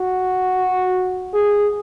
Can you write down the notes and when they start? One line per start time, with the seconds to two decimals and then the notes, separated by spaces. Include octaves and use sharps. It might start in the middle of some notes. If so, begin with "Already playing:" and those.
Already playing: F#4
1.34 G#4